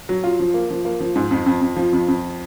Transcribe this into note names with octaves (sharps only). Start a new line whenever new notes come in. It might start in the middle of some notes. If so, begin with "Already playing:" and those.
F#3
F4
F3
A#3
F3
A#3
F3
G#2
F2
F2
F2
F3
F2
F2